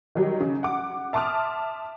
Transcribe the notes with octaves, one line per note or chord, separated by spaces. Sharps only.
D#3 F#3 G3
C#3
F#5 D6
E5 A5 C6 D6 D#6 F6